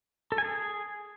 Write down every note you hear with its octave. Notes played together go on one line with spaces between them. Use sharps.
A4
G#5
G#4